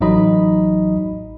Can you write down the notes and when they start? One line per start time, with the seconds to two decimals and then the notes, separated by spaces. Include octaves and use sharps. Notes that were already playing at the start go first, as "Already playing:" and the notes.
0.01 A1 F#3 D#4 D#5 B5